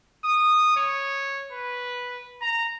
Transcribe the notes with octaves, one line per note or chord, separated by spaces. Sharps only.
D#6
C#5
B4
A#5